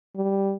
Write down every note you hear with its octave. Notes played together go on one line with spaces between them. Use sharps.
G3